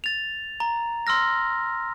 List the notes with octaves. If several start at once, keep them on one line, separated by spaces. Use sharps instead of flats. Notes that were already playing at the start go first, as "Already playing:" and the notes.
A6 F7
A#5
C6 E6 F6 A#6